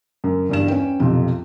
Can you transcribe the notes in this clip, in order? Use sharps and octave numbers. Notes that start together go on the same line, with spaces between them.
F#2
E2 G2 E7
C#4 B4 G5
B1 F2 C3 F3